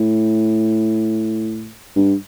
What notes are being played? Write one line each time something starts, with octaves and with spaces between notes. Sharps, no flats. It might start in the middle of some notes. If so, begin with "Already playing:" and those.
Already playing: A2
G2